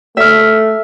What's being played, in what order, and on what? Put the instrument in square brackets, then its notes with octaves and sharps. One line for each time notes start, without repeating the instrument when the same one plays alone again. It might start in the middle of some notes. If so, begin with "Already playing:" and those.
[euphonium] A3 [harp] E5 F6